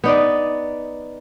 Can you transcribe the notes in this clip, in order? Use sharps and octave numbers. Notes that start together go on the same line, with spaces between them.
B3 D#4 D5